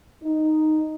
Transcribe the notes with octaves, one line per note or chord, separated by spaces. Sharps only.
D#4